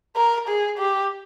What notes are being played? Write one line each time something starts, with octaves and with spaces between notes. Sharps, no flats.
A#4
G#4
G4